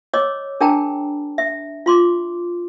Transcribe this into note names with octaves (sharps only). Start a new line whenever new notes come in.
C#5 D#5 D6 E6
D4 G#4 A#4 G5 A5 A#5
E5
F4 C6 D6